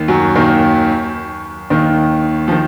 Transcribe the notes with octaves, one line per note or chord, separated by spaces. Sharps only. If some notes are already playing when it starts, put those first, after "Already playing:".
Already playing: D#2 D#3
F#2 F#3
D#2 D#3
D#2 D#3
F3
D#3